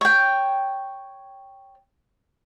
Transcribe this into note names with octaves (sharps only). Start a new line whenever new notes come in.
C#5 G5